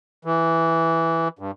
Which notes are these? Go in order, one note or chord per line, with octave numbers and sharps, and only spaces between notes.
E3
G2